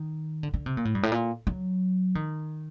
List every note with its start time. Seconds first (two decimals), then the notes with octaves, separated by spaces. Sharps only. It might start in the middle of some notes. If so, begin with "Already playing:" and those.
Already playing: D#3
0.43 D3
0.54 D3
0.66 C3
0.77 A#2
0.85 A2
0.95 G2
1.03 A2
1.12 A#2
1.47 F#3
2.15 D#3